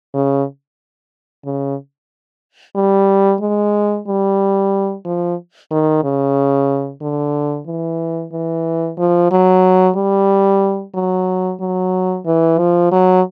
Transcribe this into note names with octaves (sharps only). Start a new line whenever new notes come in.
C#3
C#3
G3
G#3
G3
F3
D#3
C#3
D3
E3
E3
F3
F#3
G3
F#3
F#3
E3
F3
F#3